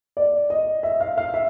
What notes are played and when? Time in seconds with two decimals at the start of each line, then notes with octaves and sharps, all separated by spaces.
0.17 D5
0.50 D#5
0.83 E5
1.00 F5
1.18 F5
1.34 E5